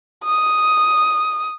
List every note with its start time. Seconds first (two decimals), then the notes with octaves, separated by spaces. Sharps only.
0.24 D#6